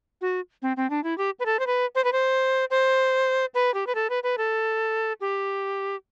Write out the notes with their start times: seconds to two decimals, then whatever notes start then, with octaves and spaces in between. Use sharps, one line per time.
0.21 F#4
0.62 C4
0.77 C4
0.90 D4
1.04 E4
1.18 G4
1.40 B4
1.46 A4
1.59 C5
1.67 B4
1.95 C5
2.04 B4
2.12 C5
2.70 C5
3.54 B4
3.74 G4
3.87 B4
3.95 A4
4.10 B4
4.23 B4
4.38 A4
5.21 G4